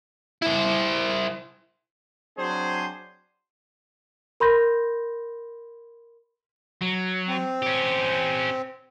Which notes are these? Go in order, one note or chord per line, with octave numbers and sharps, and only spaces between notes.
E4 C5
F#3 C4 D4 G#4 C5
A#4 B5 C6 G6 A#6
F#3
C4
C#4 G4